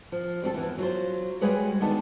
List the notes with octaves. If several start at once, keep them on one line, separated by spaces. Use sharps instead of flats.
F3
G3 C4 F#4 A4
E2 E3
F#3 F4 C5
G3 G#3 F#4 G#4 B4 C#5
D3 D#3 B3 A5